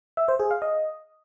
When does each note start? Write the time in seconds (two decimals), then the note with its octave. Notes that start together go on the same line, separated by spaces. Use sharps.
0.17 E5
0.28 C5
0.40 G#4
0.51 F5
0.62 D#5